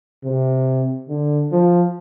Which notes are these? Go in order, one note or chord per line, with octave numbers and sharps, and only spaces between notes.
C3
D3
F3